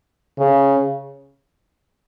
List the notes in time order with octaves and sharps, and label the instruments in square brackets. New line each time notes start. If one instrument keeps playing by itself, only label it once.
[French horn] C#3